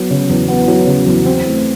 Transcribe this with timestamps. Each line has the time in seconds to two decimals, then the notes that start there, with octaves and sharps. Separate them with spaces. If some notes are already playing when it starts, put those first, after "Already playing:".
Already playing: F#3 B3
0.11 C#3
0.29 E2
0.48 B3
0.68 F#3
0.87 C#3
1.06 E2
1.26 C4
1.46 A3